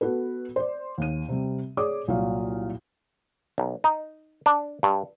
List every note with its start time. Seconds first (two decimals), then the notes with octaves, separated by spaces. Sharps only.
0.01 B3 F#4 A4 B4
0.56 C5 D5
0.98 D#2 D#7
1.29 C3 G3
1.77 G#4 C#5 D5 D6 D#6
2.08 C2 A#2 F#3 F5
3.58 B1
3.84 D#4
4.46 D4
4.83 G2